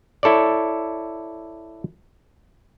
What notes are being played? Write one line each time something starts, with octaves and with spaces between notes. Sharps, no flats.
E4 A4 C#5 D5